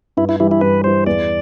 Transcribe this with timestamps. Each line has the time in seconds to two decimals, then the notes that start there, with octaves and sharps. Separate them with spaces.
0.17 G2 E4
0.29 E4
0.40 E3 G3 E4
0.51 E4
0.61 G2 B4
0.84 E3 G3 C5
1.06 E2 D5